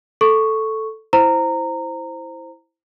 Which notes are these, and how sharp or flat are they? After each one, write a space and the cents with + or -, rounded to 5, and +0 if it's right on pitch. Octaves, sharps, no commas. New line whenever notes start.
A4 +0 C#6 +0
E4 +0 C5 +0 A#5 -15